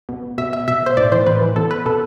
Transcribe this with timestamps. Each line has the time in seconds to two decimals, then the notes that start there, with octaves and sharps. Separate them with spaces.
0.09 B2
0.38 B2 E5
0.53 E5
0.68 B2 E5
0.86 C5
0.97 A2 D5
1.12 E3 C5
1.27 A2 B4
1.41 E3
1.56 B2 A4
1.71 B4
1.86 B2 A4